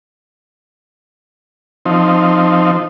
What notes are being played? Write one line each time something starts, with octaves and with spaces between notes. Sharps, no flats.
F3 C4 D#4